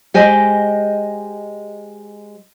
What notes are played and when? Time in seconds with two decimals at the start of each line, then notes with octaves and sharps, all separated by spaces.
0.14 G#3 G4 C5 D#5 G5 G#5